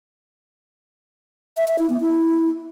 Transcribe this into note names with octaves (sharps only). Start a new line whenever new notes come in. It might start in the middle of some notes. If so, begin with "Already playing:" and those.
E5
E5
E4
B3
E4